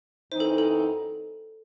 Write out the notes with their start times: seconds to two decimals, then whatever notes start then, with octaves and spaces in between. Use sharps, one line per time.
0.32 F#2 E3 C4 D#4 C5
0.40 A4
0.58 A4